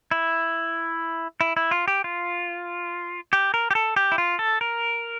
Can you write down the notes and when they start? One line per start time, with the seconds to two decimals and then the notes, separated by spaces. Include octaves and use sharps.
0.11 E4
1.41 E4
1.57 E4
1.71 F4
1.88 G4
2.04 F4
3.33 G4
3.54 A#4
3.71 G4
3.75 A4
3.96 G4
4.12 E4
4.18 F4
4.39 A4
4.61 A#4